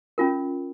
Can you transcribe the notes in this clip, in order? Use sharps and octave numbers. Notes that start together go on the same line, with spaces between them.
C#4 F4 A#4